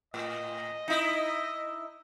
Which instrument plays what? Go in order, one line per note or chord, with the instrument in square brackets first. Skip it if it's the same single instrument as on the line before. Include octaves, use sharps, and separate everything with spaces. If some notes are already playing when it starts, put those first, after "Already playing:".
[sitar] A2 [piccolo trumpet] D#5
[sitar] D#4 E4